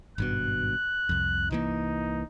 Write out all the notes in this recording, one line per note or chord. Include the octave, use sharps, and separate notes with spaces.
G#1 G2 B2 F#6
C2 F2
C2 E3 A#3 D#4